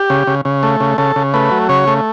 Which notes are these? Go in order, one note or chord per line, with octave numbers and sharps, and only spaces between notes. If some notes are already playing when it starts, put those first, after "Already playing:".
Already playing: G4
C#3
C#3
C#3
A3
C#3
C#3 A4
C#3
A3 B4
F#3
C#3 C#5
A3